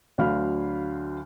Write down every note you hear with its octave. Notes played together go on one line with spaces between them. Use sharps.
D2 D3 F#3 F5 B5 F6